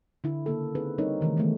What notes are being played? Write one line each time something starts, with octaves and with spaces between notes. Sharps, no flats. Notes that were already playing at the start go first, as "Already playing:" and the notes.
D3 E4
C#3 A#3 A4
C4 D#4 G#4 B4
G3 C4 D4 D#4 A#4 C#5
C3 D#3 E3 A3
D#3 E3 G#3 A3 B3 E4